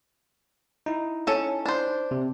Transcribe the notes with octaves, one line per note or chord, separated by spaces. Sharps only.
D#4 E4
C#4 A4
D4 C5
C3